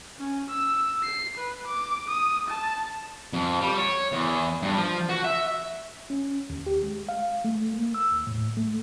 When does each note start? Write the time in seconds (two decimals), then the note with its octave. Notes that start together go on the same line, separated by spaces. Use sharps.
0.19 C#4
0.50 E6
1.03 C7
1.37 B4
1.67 D6
2.09 D#6
2.48 A5
3.33 F2
3.60 G3
3.77 C#5
4.12 E2
4.62 G2
4.76 F3
5.09 F#4
5.24 E5
6.10 C#4
6.50 D#2
6.66 G4
6.83 G#3
7.09 F5
7.44 A3
7.74 A#3
7.94 E6
8.12 D#2
8.27 A2
8.57 A3